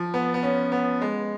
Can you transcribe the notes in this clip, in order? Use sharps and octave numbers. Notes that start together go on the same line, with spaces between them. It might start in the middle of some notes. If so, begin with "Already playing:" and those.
Already playing: F3
B3
B3
C#4
B3
G#3